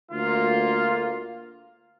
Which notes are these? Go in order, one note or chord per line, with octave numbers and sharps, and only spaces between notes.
D2 A#3 F4